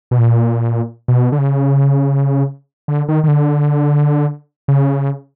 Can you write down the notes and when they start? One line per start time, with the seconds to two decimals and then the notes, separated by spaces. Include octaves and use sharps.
0.11 B2
0.18 A#2
1.08 B2
1.32 D3
1.38 C#3
2.88 D3
3.08 D#3
3.24 D#3
3.28 D3
4.68 C#3